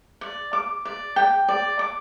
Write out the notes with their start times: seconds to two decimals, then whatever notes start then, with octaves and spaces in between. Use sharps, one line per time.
0.21 D5
0.53 D6
0.85 D5
1.16 G5
1.48 D5
1.79 D6